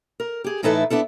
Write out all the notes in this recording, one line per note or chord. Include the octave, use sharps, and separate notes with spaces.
A#4
G4 G#4
A2 E3 D#4 E4 A4 B4
B3 D4 E4 A4